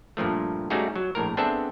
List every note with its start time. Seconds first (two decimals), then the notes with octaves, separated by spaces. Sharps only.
0.17 G2 A#2 F3 A3
0.70 G3 A3 C#4 D#4 F#4 G#4
0.96 F#3
1.15 A#1 A2 A#4
1.37 B3 C4 D4 G#4 A4 E5